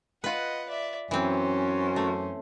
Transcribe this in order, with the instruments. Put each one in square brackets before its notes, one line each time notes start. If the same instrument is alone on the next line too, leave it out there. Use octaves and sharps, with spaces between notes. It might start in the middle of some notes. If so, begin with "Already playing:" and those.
[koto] F4 B4 [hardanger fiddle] D#5 F#5
[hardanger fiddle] D5 E5
[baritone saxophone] F#2 [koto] E3 C4 [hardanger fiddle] C#4 C5
[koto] A3